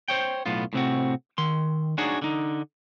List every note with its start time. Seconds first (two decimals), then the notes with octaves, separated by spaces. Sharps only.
0.08 C5 C#5 G5
0.46 B1 A2 B3 F4
0.73 A2 C3 C4 F#4
1.38 D#3 C6
1.98 D4 D#4 F#4 G#4 C#5
2.22 D3 D#4